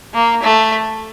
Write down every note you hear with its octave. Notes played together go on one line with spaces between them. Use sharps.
A#3
A3